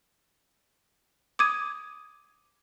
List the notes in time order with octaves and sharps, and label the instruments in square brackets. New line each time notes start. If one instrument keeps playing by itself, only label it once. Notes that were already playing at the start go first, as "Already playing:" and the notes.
[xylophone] D6 D#6 G#6 D#7